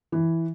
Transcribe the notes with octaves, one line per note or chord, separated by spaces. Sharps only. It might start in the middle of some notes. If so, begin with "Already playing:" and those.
E3